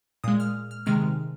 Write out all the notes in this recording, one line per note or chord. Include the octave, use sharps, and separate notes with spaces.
A#2 G#3 D#6
F6
F6
C3 D#3 G#3 F6